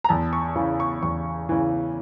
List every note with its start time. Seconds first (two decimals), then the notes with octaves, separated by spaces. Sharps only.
0.04 A#5
0.09 E2 A5
0.33 C#6
0.56 C#3 E3 C#6
0.80 C#6
1.03 E2 C#6
1.49 C#3 E3